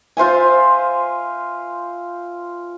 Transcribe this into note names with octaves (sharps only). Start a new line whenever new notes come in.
F4 C5 E5 G#5